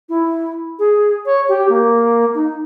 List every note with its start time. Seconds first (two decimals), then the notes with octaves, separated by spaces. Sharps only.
0.09 E4
0.79 G#4
1.25 C#5
1.48 G4
1.69 A#3
2.34 D#4